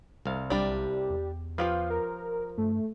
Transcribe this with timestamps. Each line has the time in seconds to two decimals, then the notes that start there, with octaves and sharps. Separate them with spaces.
0.26 C2 F5
0.50 B1 G3 D4 G4
1.09 E2
1.58 F3 F4 G4 B4 F5
1.90 A#4
2.58 G2 A3